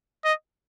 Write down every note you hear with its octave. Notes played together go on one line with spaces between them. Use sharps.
D#5